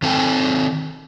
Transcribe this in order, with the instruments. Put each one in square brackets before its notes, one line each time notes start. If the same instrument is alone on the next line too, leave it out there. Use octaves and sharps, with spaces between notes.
[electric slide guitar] D#3 C4 A4 F5 G5 G#5